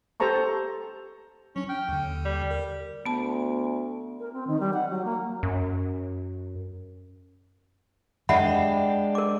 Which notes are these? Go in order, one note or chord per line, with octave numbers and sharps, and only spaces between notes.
G4 A4 C5 A5 A#5 C#6
F#3 C#4 D4
G5 F6
D#2 D3
G3
A#4
D2 B3 A5
A#4
C4
D#3
G3
F#5
F#3
A#3
F#2
G#3 D4 G4 E5 F#5 B5
A#4 D6